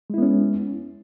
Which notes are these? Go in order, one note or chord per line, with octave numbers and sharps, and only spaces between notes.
G#3 B3 C#4 E4